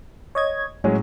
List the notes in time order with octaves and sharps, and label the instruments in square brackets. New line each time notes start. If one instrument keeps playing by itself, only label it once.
[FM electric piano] C#5 D#5 G#6
[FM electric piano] A2 [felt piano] F#3 G#3 C#4